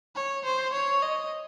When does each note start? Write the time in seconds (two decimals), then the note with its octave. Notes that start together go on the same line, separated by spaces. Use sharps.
0.16 C#5
0.45 C5
0.73 C#5
1.02 D#5